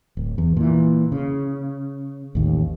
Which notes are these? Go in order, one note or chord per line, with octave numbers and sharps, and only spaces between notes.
D1
E2
A#2 E3
C#3
A1 D#2